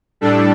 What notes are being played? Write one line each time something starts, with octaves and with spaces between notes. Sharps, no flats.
A2 G3 D4 A4